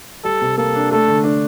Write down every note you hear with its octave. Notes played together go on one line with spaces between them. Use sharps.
G3 A4
C3
A#3 A4
D4
A3 A4
D3
D4